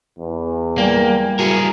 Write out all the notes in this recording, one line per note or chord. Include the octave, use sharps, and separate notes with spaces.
E2
G3 A#3 D5 G5 G#5
E4 F#4 G#4 A#4 C#7